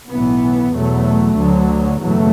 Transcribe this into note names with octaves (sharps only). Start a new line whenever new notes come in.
B1 A2 E3 B3
E2 B2 F#3 A3
D2 D3 F#3
F#1 E2 B2 F#3 A3